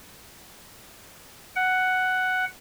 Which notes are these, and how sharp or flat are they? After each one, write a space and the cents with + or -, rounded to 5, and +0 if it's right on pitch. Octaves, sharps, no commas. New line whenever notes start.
F#5 +5